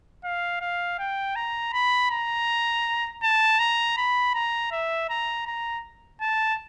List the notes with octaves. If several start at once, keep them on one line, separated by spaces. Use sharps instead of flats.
F5
F5
G5
A#5
B5
A#5
A5
A#5
B5
A#5
E5
A#5
A#5
A5